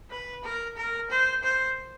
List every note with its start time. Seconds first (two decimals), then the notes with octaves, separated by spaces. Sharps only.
0.11 B4
0.44 A#4
0.77 A#4
1.10 C5
1.43 C5